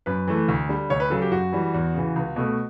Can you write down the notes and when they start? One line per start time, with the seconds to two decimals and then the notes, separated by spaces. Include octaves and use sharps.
0.06 F#2 B4
0.28 E3 A3
0.48 D2
0.69 D3 G3
0.90 D2 C#5
1.00 B4
1.10 C#3 F#3 A4
1.22 G4
1.31 F#2 F#4
1.52 E3 G3
1.74 E2
1.95 C#3 E3
2.16 C#2
2.36 B2 A3